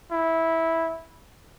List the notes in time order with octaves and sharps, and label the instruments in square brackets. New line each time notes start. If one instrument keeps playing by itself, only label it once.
[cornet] E4